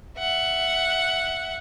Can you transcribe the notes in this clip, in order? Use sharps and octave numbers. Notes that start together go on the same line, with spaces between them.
E5 F#5